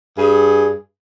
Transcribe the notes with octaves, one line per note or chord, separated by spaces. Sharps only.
G2 G#4